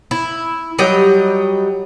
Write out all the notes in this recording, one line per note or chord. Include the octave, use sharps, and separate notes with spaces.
E4
F#3 G3 D#5 G5